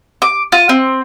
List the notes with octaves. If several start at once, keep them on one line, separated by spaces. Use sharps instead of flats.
D6
F4
C4